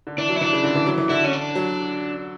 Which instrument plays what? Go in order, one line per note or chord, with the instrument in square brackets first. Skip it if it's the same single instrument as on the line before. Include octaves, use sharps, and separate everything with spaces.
[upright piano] D3
[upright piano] E3 [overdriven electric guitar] D4
[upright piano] F#3
[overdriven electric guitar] E4
[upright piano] E3 [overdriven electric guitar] D4
[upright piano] C#3
D3
E3
F#3
E3
[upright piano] D3 [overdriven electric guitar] E4
[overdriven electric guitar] C#4
D4
[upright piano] F#3